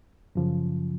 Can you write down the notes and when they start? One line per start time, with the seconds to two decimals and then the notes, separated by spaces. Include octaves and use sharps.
0.35 F#2 C#3 F3